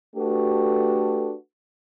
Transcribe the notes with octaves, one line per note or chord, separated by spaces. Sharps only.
A3 D4 F#4 G4 A4 B4